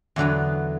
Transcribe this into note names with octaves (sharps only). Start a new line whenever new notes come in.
E2 D3 F#3 B3